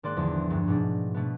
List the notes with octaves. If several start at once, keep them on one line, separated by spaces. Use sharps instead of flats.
G#1 A#3 D5 C6 F#6
E2 D3 F3 A#3
D2 G2 D3
G#2 B2 A3 D4
B2 A3 B3